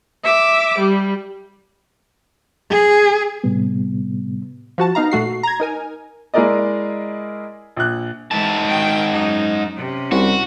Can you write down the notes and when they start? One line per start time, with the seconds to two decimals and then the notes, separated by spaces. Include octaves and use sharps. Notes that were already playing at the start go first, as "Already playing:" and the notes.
0.24 E5 D6
0.79 G3
2.71 G#4
3.44 A2 C3 G3 B3
4.78 F3 F#4 A5
4.95 B3 D#4 F5 A#5
5.11 A#2 A3 F#4 C7
5.43 A#5 G#6
5.60 D#4 A#4 G#5
6.34 G#3 E4 G#4 A#4 D5 D#5
7.77 A#1 F#6
8.31 G#2 E3 G#3 A5
8.66 D#3 G5
9.11 F#2 D#4
9.76 C3 C#4
10.12 C2 F#4